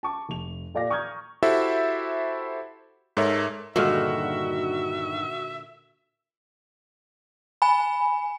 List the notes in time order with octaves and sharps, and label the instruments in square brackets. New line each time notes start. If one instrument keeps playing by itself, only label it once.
[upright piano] A5 C#6 D6
F1 F7
A#2 A4 D5 F5 D6 A#6
A#5 C#6 D#6 F6 G6 G#6
[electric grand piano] E4 F#4 G4 A4 C5 E5
G#2 A4 A#4 C#5 E5
[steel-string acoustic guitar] G2 D#3 [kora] A#2 D3 G#3 [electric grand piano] F#4 F6 [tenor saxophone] E5
[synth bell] G#5 B5